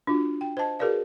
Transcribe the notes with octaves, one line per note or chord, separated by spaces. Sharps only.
D4 F4 F#4
G5
C5 D#5 A5
F#4 G#4 A#4 B4 D5 F5